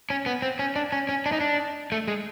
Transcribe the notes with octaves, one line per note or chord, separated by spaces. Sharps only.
C#4
B3
C4
C#4
D4
C#4
C#4
D4
D#4
D4
A3
G#3